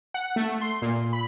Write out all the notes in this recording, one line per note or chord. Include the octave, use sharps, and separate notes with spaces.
F#5
A3
C6
A#2
B5